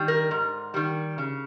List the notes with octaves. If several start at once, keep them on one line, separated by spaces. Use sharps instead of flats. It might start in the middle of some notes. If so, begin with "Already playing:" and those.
Already playing: D#3 G3
A#4
G#2
D#3 G3
C#3